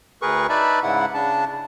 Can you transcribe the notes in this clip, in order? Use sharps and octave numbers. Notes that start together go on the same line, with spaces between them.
D2 G#4 A#4 B4 C#6
D#4 B4 D5 E5 A5 B5
G#2 C#3 E4 F#5
C#3 D4 A5